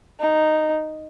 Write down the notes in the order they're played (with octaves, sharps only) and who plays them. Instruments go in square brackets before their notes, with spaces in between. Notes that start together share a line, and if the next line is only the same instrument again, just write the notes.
[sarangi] D#4